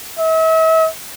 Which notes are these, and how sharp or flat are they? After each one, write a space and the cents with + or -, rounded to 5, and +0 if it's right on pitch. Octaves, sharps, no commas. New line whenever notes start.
E5 -40